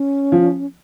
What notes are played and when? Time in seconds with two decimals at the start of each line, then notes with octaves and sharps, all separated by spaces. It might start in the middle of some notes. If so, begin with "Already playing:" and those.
Already playing: C#4
0.32 F3